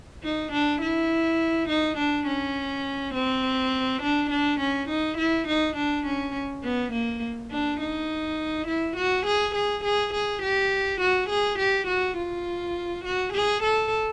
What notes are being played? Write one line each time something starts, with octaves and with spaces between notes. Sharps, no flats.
D#4
D4
E4
D#4
D4
C#4
C4
D4
D4
C#4
D#4
E4
D#4
D4
C#4
B3
A#3
D4
D#4
E4
F#4
G#4
G#4
G#4
G#4
G4
F#4
G#4
G4
F#4
F4
F#4
G#4
A4